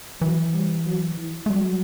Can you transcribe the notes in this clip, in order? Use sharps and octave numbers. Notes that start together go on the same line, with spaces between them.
E3 F#3
G3
F#3
E3
A3
F#3 G3